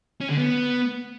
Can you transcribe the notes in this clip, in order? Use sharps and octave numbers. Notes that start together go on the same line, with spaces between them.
C#4
D3
B3